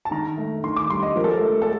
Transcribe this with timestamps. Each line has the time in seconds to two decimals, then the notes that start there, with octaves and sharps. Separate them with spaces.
0.05 A5
0.11 D#3 A#5
0.38 A3
0.64 D#3 C6
0.76 D6
0.90 G3 C6
1.03 D#5
1.16 F3 A#4
1.24 A4
1.33 A#4
1.41 A3
1.62 A4